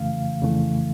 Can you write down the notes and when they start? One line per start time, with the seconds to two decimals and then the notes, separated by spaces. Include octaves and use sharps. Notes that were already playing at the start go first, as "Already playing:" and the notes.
Already playing: F2 C#3 E3 A3 F5
0.41 F2 C#3 E3 A3